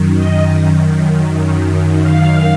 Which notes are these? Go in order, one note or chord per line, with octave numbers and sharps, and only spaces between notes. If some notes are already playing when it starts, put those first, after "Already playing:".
Already playing: F#2 D#3
D#5
F#2 D#3
F5